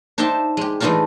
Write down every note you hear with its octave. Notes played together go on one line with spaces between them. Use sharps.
D4 D#4 C5 E5 G5 A5
G#3 G4
E3 G#3 A3 D4 D#4 F4